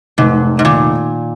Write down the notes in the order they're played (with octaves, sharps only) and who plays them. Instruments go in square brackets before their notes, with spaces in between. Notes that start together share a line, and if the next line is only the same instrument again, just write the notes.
[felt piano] F1 [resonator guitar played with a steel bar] G#2
[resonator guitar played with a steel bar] G#2
[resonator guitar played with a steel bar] A#2 [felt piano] D#3